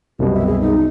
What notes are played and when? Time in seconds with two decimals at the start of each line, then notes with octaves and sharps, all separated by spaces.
0.19 C2 F#2 B2 G4
0.33 E5
0.47 G#4
0.60 D#4